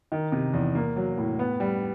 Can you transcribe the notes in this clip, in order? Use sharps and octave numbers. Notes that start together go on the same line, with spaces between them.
D#3
C3
E2
A#3
F#3
A2
B3
G3